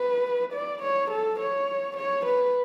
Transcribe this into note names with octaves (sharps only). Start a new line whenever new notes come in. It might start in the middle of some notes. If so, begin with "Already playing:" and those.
Already playing: B4
D5
C#5
A4
C#5
C#5
B4